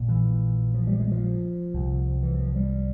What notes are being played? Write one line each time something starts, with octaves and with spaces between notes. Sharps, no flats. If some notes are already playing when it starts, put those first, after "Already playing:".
Already playing: A#1 A#2
E3
F3
G3
G#3
F3
C2 C3
E3
F3
G3